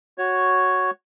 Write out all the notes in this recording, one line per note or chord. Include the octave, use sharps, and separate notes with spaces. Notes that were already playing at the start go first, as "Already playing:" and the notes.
F#4 C#5